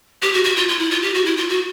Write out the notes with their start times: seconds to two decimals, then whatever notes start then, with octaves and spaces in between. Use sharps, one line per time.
0.22 G4
0.34 F#4
0.44 F#4
0.56 F4
0.68 F4
0.79 E4
0.91 F4
1.02 G4
1.14 F#4
1.25 E4
1.37 F4
1.49 F#4